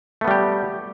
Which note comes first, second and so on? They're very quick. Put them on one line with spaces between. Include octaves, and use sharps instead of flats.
A3 B3 G3 G4